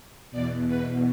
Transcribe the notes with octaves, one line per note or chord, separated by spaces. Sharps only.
E2 B2 D5
B4